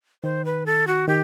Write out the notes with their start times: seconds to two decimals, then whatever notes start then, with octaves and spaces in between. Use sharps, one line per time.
0.23 D#3 C5
0.45 B4
0.66 A4
0.87 F#4
1.08 D#3 G4